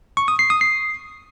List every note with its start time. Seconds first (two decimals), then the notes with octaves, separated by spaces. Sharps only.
0.17 C#6
0.28 D#6
0.39 C7
0.50 D#6
0.61 C7